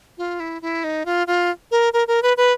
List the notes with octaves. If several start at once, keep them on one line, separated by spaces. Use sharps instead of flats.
F4
E4
E4
D#4
F4
F4
A#4
A#4
A#4
B4
B4